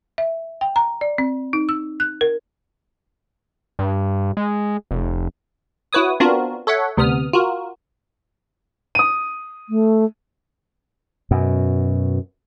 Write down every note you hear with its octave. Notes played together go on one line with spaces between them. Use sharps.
E5
G5
A#5
D5
C4
D#4
E6
F#6
A#4
G2
G#3
F1
E4 F#4 B4 C#5 D#6
B3 C4 D4 F4 F#4 A#4
A4 C#5 E5 F#5
D2 C3 B3 D#6 F6
F4 F#4 A#4
D#6 D#7
A3
F#2 B2